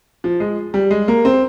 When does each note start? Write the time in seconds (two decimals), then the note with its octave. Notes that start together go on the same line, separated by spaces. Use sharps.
0.24 F3
0.40 G#3
0.74 G3
0.91 G#3
1.08 A#3
1.25 C4